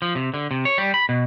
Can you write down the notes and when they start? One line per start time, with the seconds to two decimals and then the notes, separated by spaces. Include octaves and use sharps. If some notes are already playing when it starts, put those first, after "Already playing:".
0.02 F3
0.15 C3
0.34 D3
0.51 C3
0.65 C#5
0.78 G3
0.94 B5
1.09 B2